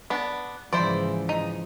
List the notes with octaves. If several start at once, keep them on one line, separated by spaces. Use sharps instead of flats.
B3 D4
G#2 C#3 E3 F3 E4 C5 D5
D#4